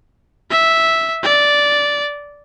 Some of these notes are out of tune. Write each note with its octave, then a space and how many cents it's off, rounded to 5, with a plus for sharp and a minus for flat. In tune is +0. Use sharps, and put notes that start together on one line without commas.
E5 -5
D5 -10